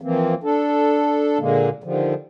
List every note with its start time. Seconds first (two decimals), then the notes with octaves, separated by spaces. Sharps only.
0.01 E3 F3 A#3 C4
0.44 D4 A4
1.39 A#2 D3 G#3 A#3
1.84 D3 D#3 F3 G3